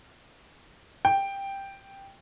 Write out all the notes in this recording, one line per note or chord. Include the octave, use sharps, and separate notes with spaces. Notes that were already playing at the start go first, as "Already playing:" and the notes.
G5